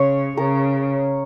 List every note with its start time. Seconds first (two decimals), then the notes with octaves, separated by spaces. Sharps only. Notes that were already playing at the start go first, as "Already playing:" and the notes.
Already playing: C#3 C#5
0.37 C#3 A#4